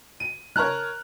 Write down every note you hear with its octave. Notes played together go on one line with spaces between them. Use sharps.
D#7
A#4 C#5 A5 A#5 F6 F#6